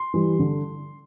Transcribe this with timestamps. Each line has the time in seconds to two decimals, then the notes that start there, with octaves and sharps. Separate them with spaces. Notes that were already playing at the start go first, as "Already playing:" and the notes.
Already playing: C6
0.14 E3 G3
0.39 D3